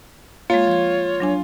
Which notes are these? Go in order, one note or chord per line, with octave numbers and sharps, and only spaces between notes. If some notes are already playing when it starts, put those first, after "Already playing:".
G#3 A#3 F4 C#5
F3 G#6
F#3 D4 G#5